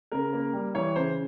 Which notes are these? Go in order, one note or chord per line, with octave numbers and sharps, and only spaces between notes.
C#3 A#4
A#3
G3
E3 C#5
C#3 C5